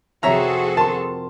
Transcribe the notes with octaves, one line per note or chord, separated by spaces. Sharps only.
F1 C4 F#4 G#4 A4 C#5 E5 A#5
A#4 A5 C6